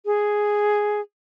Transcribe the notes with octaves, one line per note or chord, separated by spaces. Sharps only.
G#4